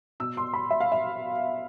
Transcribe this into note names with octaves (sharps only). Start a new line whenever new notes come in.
B2 E6
C6
B5
E5
F5
E5